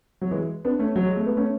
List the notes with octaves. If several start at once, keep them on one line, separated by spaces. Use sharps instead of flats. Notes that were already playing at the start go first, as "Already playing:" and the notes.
F#3
E3 G#3
B3 D4
A3 C#4
F#3
G#3
A3
B3
A3 C#4